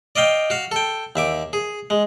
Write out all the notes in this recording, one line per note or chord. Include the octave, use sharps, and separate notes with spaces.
D5 D#5 F5 G5
F#4 F5
A4 G5
D#2 E5 D6
G#4
G#3